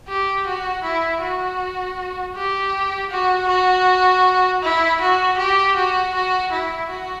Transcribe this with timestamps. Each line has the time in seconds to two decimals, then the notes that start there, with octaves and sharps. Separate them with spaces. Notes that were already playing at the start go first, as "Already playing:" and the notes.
0.08 G4
0.46 F#4
0.84 E4
1.22 F#4
2.36 G4
3.11 F#4
3.49 F#4
4.63 E4
5.01 F#4
5.38 G4
5.76 F#4
6.15 F#4
6.52 E4
6.90 F#4